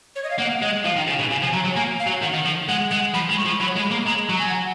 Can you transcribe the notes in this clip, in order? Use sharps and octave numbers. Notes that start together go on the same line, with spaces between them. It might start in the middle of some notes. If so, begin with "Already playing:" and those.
C#5
D#5
F5
A#3 F#5
G#3 D#5
F3 F5
D#3
C#3
B2
C#3 G#5
F3 G#5
F#3 A#5
F#3
A#3 G#5
F5
F#3
D#3 F#5
D#3
F3
G#3 F#5
G#3 F#5
F3 B5
G#3
C#6
F3
F#3 B5
G#3
B5
A#3
B5
G#3 A#5
F#3 A#5
G#5
F#5